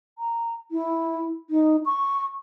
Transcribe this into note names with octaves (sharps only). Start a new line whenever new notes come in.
A#5
E4
D#4
C#6